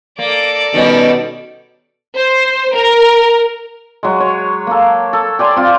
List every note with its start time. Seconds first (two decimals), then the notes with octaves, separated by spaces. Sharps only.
0.19 A#3 A4 D5
0.74 B2 D#3 G3 C#4
2.17 C5
2.75 A#4
4.03 F#3 G#3
4.20 C#5
4.67 A#3 A4
5.13 A4
5.39 G4 D5 G#5 C6
5.56 C4 F4